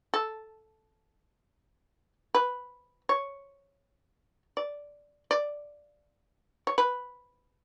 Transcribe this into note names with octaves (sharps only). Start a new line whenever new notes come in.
A4
B4
C#5
D5
D5
C#5
B4